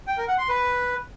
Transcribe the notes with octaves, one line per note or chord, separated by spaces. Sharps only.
G5
A#4
F#5
C6
B4